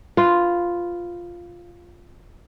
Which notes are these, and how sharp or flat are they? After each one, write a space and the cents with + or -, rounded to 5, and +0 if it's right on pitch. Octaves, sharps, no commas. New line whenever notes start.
F4 +0 B4 +10